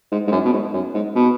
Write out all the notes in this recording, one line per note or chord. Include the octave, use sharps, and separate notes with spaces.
G#2
G#2
F#2
B2
G#2
F#2
G#2
B2